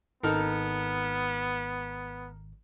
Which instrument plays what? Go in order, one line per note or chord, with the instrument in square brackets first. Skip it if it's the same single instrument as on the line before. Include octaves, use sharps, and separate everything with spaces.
[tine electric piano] G#1 [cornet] B3 [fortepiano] D#4 A4 A#4